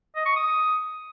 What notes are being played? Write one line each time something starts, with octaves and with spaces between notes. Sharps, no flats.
D#5
C#6
D#6